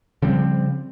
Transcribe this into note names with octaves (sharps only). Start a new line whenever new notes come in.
C#3 F3 G3 C4